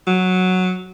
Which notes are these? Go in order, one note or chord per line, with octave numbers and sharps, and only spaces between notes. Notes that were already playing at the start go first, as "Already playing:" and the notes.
F#3